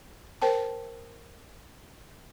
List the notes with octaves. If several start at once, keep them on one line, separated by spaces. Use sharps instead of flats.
A#4 C5 G5 A5